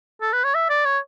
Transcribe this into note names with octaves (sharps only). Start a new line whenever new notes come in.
A4
B4
C#5
E5
D5
C#5